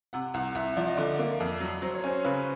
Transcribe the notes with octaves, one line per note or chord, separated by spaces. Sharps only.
C3 F#5
C2 F#5
C2 E5
F3 D5
D#5
D3 D5
A#3
F2
F#3
F#3 C5
C#5
C#4 C5
C#3 B4